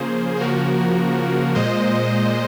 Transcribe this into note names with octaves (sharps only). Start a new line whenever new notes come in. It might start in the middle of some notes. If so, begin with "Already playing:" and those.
Already playing: C#3 F3 A#3 G#4 C5
G#4
C#3 F3 A#3 F#4 A#4
A#2 G#3 C5 D#5